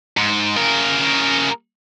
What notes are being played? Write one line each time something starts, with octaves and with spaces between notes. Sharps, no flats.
G#2
C#3 A#4